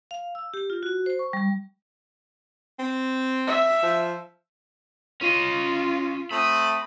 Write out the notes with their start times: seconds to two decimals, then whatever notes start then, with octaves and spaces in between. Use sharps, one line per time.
0.11 F5
0.35 E6
0.54 G4
0.70 F4
0.83 F#4
1.06 C5
1.19 C#6
1.33 G3
2.79 C4
3.47 E5
3.83 F3
5.21 C#4 F4 D#5
6.31 A3 C4 B5 D#6